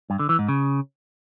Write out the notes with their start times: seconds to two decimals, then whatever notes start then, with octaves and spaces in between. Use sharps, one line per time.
0.10 G2
0.19 D3
0.29 E3
0.39 G#2
0.49 C#3